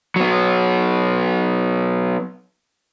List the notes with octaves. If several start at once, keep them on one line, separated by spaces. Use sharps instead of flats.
F#3 B3